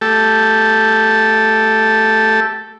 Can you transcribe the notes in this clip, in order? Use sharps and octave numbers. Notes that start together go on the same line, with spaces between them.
A3 G4 A4